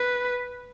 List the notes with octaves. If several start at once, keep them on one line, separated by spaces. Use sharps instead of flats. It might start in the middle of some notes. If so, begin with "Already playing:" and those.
Already playing: B4